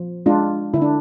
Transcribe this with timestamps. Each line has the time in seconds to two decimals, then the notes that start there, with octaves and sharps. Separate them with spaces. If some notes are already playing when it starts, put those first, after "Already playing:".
Already playing: F3
0.26 G#3 D4 F4
0.74 D3 E4
0.82 D4